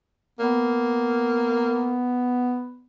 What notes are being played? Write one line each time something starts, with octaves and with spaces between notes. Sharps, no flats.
A#3 B3